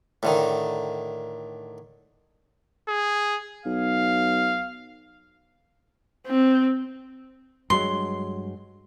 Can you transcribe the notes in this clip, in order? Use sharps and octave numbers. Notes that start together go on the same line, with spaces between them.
A2 D3 D#3
G#4
B1 F5
C4
G2 F#3 G#3 C6